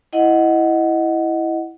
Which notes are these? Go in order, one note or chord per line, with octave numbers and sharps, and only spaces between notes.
E4 D#5 F#5